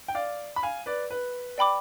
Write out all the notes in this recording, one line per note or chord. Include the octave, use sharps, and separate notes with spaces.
G5
D5 F5
B5
F5 G#5
B4 D5
B4
D5 G5 B5 D6